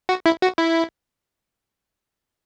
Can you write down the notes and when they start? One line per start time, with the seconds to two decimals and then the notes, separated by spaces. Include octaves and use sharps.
0.09 F#4
0.26 E4
0.42 F#4
0.58 E4